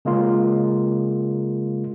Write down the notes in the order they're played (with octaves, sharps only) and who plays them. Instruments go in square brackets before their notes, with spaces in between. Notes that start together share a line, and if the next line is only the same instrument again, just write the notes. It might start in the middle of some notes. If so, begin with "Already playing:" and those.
[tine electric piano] C#3 G#3 A#3 F4